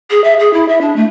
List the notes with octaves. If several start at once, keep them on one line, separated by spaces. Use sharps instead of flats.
G#4
E5
G#4
E4
E5
D4
A3